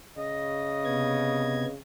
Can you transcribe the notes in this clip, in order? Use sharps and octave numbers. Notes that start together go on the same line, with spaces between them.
C#3 D#5
C3 B3 G#6